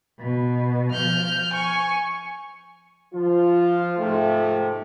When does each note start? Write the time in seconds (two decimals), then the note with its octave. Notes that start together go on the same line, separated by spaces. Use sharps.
0.18 B2
0.92 F3 F6 G6
1.53 G#5 C#6
3.14 F3 F4
3.99 G#2 C3 F3 A3